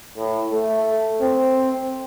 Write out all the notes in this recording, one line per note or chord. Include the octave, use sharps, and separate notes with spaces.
A2
A3
C4